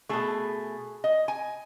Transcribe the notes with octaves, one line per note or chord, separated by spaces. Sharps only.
B2 A3 G#4
D#5
G#5